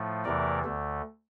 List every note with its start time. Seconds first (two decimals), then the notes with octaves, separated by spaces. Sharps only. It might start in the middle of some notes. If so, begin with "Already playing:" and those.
Already playing: A2 F3 A3
0.25 E2 C3 E3 A3 A#4 D5
0.64 D2 D3 A3